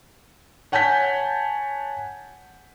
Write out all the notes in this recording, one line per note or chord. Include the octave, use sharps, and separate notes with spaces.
C#5 F#5 G#5 A5 G6 B6